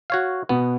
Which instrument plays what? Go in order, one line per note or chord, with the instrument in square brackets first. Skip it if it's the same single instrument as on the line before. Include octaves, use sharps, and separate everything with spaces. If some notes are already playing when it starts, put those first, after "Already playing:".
[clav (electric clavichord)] F#4 C#5 F5
[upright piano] B2 [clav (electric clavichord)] B3